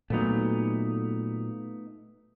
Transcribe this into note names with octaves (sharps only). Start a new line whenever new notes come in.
A#2 F#3 A3 B3 D#4